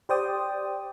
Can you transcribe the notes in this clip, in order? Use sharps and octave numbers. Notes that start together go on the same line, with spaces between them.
G4 C5 D5 G5 D#6